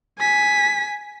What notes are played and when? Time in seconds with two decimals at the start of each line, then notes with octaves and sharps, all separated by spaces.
0.19 G#5 B6